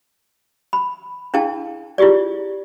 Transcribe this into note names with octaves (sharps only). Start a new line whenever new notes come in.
B5
D4 E4 G#4 F5 G5 A5
E4 F4 G4 G#4 D5